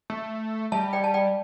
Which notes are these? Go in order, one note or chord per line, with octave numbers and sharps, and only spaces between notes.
A3
G3 E5 A5
D5 G5
A5
D5 G5